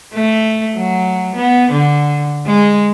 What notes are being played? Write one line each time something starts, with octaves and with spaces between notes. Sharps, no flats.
A3
F#3
B3
D3
G#3